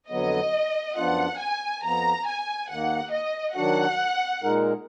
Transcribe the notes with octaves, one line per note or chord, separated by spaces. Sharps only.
F2 D3 F#3 B3 D#5
F#2 F3 B3 D4 F4 F#5
G#5
F2 F3 B3 A#5
G#5
D#2 D#3 A#3 F#5
D#5
D#3 F#3 D4 F#4 F#5
A#2 G#3 D#4 A#4